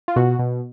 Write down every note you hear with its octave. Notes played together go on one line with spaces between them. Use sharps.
F4
B2 F#4
B2